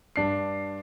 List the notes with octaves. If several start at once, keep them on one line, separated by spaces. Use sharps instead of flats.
G2 D4 C7